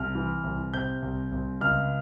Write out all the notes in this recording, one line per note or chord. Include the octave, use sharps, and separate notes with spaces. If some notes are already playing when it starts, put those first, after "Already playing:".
Already playing: C2 F6
E3
C2
C3 G6
C2
C2
C#2 F6